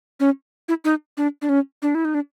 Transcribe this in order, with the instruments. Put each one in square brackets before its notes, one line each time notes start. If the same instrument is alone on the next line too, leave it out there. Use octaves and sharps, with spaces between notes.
[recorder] C#4
E4
D#4
D4
D4
C#4
D4
E4
D#4
D4